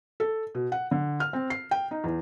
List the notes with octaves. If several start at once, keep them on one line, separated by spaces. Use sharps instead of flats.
A4
B2
F#5
D3
F6
C4
C7
G5
D#4
E2